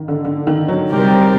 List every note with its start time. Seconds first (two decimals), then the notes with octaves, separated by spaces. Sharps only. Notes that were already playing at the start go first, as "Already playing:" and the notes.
Already playing: D#3
0.08 D3
0.25 D3
0.47 D#3
0.68 F#3
0.91 C3 G3 C4 G4 A#4